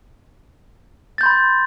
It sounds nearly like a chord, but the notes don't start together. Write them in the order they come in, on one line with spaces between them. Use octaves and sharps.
A6 G6 C6 B5